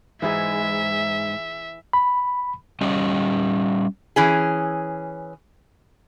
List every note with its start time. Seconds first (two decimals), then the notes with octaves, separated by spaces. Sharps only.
0.22 G#2 E3 E4 G#4 E5
1.93 B5
2.81 G3 C#4 G4 D#5
4.16 E3 C#4 G#4